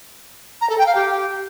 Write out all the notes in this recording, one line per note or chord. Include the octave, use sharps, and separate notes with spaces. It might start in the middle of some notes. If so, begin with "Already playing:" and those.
A#5
A4
G5
F5
G4